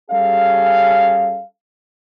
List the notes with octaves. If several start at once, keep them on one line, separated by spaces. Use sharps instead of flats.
G3 C#4 G#4 A4 F5